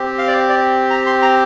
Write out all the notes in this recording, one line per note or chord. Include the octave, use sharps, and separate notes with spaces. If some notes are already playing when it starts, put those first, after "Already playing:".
Already playing: C4 G4
F5
D5
D5
A#5
C6
A#5